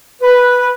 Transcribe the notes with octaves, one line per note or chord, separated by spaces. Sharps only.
B4